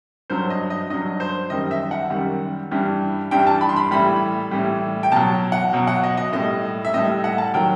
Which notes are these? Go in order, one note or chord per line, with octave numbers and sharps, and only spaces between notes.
G2 F#3 C5
D#5
D#5
G2 F#3 D#5
C5
F#2 D#3 G3 D#5
E5
F#5
F#2 D#3 G3
G2 E3 G3
G2 E3 G3 G5
A5
B5
C6
B5
A2 E3 G3 B5
A2 E3 G3
G5
B2 F#3 A5
F#5
B2 F#3
F#5
D#5
D#5
A2 G3 D#5
E5
A2 G3 D#5
F#5
A5
D#3 F#3 G5